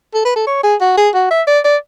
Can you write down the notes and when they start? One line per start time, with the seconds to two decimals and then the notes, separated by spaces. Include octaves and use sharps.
0.14 A4
0.25 B4
0.36 A4
0.47 C#5
0.64 G#4
0.81 F#4
0.97 G#4
1.14 F#4
1.31 E5
1.47 D5
1.65 D5